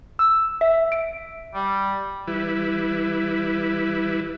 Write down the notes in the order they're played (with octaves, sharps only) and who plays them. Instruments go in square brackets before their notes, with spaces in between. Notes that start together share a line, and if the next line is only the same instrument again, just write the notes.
[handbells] E6
E5
D7
[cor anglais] G3
[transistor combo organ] E3 G3 E4 B4